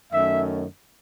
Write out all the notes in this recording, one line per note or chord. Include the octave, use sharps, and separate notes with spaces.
F#2 D#3 A3 C#4 E5